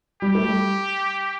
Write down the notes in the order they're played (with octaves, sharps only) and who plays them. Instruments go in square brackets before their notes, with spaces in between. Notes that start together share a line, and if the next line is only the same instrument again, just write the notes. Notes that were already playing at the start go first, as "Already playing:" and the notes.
[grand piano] G3 [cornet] G4
[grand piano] A3
G3